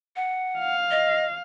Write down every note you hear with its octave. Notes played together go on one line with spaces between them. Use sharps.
F#5
F5
D#5